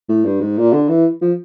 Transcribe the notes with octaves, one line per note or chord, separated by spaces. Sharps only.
A2
G2
G#2
A#2
D3
E3
F3